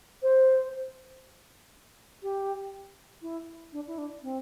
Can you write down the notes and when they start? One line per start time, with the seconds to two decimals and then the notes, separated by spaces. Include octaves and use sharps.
0.23 C5
2.23 G4
3.22 E4
3.73 D4
3.87 E4
3.98 D4
4.23 C4